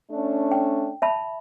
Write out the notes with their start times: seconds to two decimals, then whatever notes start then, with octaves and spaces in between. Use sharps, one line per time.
0.11 A3 C#4 D4
0.52 G5
1.02 E5 A5 B5